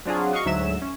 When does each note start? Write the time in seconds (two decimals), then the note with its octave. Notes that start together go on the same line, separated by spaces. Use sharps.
0.05 F#3 C4 D4 F4 F#4 G#4
0.33 F#4 D#5 F5 C#6
0.45 D2 G#2 F#3 E5 E7
0.82 C#4